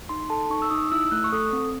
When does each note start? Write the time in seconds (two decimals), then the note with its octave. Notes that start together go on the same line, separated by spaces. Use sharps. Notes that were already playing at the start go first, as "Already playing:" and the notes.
0.09 D#4 C6
0.30 A4 A5
0.50 D#4 C#6
0.62 E6
0.70 D#4 D#6
0.92 E4 E6
1.11 A3 F#6
1.24 C#6
1.32 A4 D#6
1.53 C4